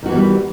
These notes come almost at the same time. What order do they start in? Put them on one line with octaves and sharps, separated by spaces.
D#3 F#4 E3 B3 G3